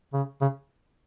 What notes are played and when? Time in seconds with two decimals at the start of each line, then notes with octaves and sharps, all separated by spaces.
0.13 C#3
0.41 C#3